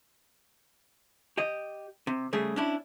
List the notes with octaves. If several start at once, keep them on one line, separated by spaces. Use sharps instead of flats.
G4 D#5
C3
C#3 G3 A3 G#4
C#4 D4 E4